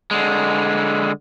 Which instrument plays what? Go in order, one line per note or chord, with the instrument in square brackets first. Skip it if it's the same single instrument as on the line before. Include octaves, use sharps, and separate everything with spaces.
[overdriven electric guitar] D3 G#3